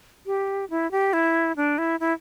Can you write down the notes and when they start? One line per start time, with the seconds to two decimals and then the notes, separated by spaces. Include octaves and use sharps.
0.26 G4
0.70 E4
0.91 G4
1.13 E4
1.56 D4
1.78 E4
2.00 E4